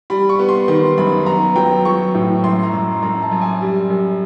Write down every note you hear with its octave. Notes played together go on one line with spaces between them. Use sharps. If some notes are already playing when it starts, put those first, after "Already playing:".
G3 B5
C#6
B3
C6
D#3 C6
F#2 B5
B3 A#5
F#3 G5
F#3 C#6
A2
F#2 C6
A#5
F#2
F#2 A#5
A5
F#2
G#5
G3
F#2